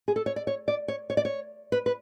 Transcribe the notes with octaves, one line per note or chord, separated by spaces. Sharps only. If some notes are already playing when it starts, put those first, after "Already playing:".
G#4
A4
C#5
D5
C#5
D5
C#5
C#5
D5
C#5
B4
B4